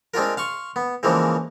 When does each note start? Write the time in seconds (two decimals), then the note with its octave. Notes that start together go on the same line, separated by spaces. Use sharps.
0.14 G#3 C4 D4 F4 A#4
0.37 F5 C6 C#6
0.76 B3
1.03 C#3 E3 F3 G#3 A#3 C4